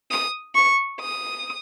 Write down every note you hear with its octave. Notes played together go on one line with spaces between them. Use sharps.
D#6
C#6
D#6